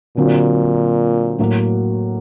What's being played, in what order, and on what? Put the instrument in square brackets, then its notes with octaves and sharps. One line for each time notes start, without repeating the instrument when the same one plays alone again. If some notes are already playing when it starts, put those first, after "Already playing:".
[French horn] A#2 [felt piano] D3 F#3 C4
[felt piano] A2 F#3 A#3 F#4